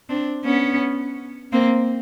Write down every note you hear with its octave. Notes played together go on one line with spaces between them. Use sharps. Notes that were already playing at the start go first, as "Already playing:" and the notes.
C4 D4
B3 C#4
A#3 C4